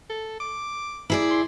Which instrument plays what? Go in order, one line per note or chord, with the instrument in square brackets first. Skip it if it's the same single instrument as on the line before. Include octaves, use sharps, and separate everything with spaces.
[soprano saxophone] A4
D6
[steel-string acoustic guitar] E4 G#4 D5
[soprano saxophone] C6